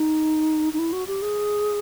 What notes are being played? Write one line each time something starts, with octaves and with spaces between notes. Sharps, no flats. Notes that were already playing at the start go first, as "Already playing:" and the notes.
Already playing: D#4
D#4
E4
F#4
G4
G#4